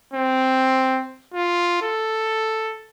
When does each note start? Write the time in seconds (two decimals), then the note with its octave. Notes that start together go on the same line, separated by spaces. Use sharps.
0.13 C4
1.34 F4
1.82 A4